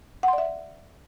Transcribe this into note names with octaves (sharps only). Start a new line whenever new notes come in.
D5 E5 F#5 C6